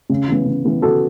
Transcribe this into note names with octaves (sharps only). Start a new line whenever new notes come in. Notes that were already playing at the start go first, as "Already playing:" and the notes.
C#3
E3 B3
C#3
E3 B3
C#3 F#4 A4